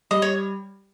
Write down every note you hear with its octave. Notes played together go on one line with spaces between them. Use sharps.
G3 D#5
C#5